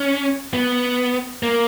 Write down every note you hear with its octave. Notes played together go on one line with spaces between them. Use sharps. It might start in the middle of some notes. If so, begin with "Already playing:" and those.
Already playing: C#4
B3
A#3